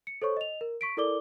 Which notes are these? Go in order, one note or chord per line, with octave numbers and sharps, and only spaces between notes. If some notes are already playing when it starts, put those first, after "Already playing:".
C#7
A4 C5 C#5 C#6
D#5 F7
A#4
C#6 B6 D7
E4 A4 A#4 D5 D6 G7